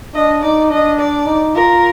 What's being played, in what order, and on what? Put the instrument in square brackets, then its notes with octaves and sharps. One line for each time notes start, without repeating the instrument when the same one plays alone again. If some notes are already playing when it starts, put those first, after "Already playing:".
[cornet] D4 [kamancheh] D#5
[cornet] D#4 [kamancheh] D5
[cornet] D4 [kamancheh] D#5
[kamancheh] D5
[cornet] D#4
[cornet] F4 [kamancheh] A#4